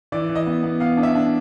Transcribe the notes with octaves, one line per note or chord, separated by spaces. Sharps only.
E3 D5
E3
D#5
B3
B3
B3 F5
D4
E5
D4